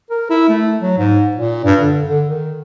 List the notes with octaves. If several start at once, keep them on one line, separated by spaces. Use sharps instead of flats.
A#4
E4
A3
F#3
G#2
A#2
G2
D3
D3
D#3